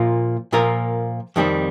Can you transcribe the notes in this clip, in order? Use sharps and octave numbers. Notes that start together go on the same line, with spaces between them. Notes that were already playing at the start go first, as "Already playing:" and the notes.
Already playing: A#2 F3 A#3 F4 A#4
A#2 F3 A#3 F4 A#4
F2 D#3 G3 C4